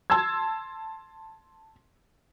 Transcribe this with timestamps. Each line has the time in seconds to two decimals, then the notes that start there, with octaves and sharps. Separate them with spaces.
0.10 A5 C6 E6 G#6